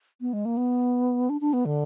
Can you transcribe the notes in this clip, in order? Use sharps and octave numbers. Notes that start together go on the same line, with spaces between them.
B3
G#3
A#3
B3
D4
D4
B3
D3